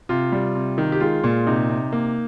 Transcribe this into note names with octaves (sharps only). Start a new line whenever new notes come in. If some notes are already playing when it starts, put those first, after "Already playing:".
C3 F4
G3
C3
D#3
G4
G#3 F4
A#2
C3 D#4
C3
A#3